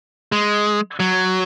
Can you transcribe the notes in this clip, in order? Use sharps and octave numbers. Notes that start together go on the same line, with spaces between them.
G#3
F#3